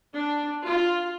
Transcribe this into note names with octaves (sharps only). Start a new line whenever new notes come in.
D4
F4